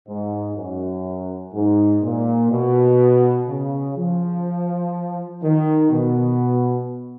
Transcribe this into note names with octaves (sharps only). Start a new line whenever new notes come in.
G#2
F#2
G#2
A#2
B2
C#3
F3
D#3
B2